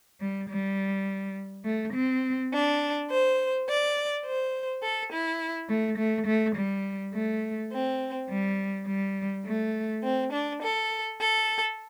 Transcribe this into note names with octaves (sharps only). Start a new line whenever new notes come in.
G3
G3
A3
C4
D4
C5
D5
C5
A4
E4
A3
A3
A3
G3
A3
C4
G3
G3
A3
C4
D4
A4
A4